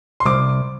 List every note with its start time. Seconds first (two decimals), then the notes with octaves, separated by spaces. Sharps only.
0.20 C6
0.25 C2 D6